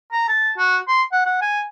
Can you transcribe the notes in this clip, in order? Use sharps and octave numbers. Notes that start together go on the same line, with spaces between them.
A#5
A5
F#4
C6
F#5
F#5
G#5